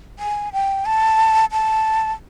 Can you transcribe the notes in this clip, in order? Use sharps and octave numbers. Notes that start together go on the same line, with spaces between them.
G#5
G5
A5
A5